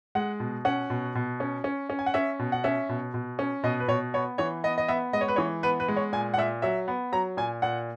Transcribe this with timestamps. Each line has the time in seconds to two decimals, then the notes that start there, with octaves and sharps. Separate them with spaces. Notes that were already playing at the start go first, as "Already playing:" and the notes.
0.15 G#3 F#5
0.40 B2
0.65 C#4 F#5
0.90 B2
1.15 B2
1.40 C#4
1.64 C#4
1.90 C#4
1.99 G#5
2.06 F#5
2.14 C#4 E5
2.39 B2
2.52 F#5
2.64 C#4 E5
2.89 B2
3.14 B2
3.39 C#4
3.64 B2 D#5
3.80 B4
3.88 B2 C#5
4.14 B3 C#5
4.38 E3 C#5
4.64 B3 D#5
4.78 D#5
4.88 B3 E5
5.13 G#3 D#5
5.21 C#5
5.28 B4
5.36 E3 C#5
5.63 B3 B4
5.80 B4
5.88 G#3
5.96 C#5
6.13 A#2 G#5
6.34 F#5
6.38 A#2 E5
6.62 F#3 E5
6.88 B3
7.12 F#3 A#5
7.37 A#2 G#5
7.62 A#2 F#5